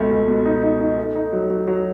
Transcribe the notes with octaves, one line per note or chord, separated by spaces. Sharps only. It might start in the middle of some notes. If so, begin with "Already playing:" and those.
Already playing: C#2 B2 A3
C#2
B2
D#4
D#4
D#4
A3
D#4
F#3
F#3
F#3